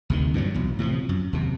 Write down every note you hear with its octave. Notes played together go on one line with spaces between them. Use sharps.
D2 C3 D#3
G2 A#2 F3 F#3
B1 E2
A2 C3 E3 F3
F#2
D#2 C3